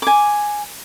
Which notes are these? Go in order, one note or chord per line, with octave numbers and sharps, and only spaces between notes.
G#5 D6